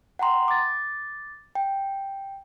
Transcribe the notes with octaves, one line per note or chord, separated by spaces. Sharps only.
F#5 G5 A#5 C6
D6 A6
G5